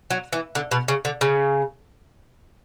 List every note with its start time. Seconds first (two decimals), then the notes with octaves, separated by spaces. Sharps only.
0.10 F#3
0.33 E3
0.55 D3
0.71 B2
0.88 C#3
1.05 D3
1.21 C#3